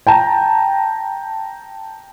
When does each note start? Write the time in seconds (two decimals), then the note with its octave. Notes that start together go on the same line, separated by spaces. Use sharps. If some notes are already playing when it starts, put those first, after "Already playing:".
0.07 G5 A5 A#5